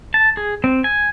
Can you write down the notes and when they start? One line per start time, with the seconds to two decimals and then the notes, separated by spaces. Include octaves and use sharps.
0.14 A5
0.37 G#4
0.64 C4
0.84 G#5